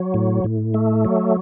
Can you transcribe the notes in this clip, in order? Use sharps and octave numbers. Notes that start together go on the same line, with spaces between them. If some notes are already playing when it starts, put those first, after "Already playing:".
Already playing: F#3
A2
A2
A3
F#3